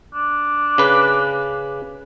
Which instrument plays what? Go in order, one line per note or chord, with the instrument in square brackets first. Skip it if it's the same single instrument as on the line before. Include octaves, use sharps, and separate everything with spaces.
[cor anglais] D4
[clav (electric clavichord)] C#3 B4